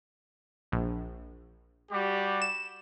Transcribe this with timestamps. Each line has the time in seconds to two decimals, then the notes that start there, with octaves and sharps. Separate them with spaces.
0.72 A#1
1.91 G3 F#4 G4
2.42 E7